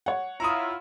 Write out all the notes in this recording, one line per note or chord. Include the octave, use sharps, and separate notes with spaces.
C#5 F#5
E4 F4 A#5 D#6